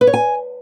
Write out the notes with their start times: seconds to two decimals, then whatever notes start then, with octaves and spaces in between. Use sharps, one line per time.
0.01 B4
0.07 C#5
0.14 G#5